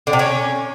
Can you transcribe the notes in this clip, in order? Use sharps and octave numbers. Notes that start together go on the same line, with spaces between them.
D3
C3
C#4